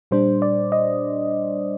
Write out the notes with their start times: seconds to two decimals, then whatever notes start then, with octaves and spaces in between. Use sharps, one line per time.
0.11 A#2 G3 D4 C5
0.42 D5
0.72 D#5